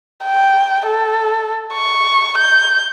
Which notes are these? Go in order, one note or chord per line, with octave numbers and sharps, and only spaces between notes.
G5
A4
C#6
G6